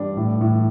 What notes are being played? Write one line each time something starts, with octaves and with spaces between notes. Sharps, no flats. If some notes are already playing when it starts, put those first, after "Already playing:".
Already playing: G2 D4
A2
A2